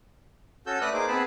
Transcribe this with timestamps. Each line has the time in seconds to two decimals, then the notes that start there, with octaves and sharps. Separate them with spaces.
0.67 C#4 F#4 A4 E6 G6
0.81 A3 B4 D5 D#6 F#6
0.93 A#3 D#4 G#4 C5 D6
1.08 B3 C4 G#4 B4 A5 B5